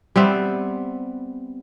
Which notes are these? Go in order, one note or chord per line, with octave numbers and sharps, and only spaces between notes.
G3 B3 C4 E5